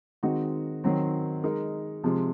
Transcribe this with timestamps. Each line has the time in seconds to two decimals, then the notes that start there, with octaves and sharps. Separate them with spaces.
0.23 D#3 G#3 C4 D#4 F#4
0.84 D#3 F#3 C4
1.43 G#3 D#4 A#4
2.04 C3 F3 G#3